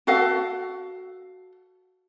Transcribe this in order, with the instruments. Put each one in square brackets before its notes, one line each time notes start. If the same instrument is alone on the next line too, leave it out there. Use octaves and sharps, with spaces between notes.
[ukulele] F#4 A4 F5 F#5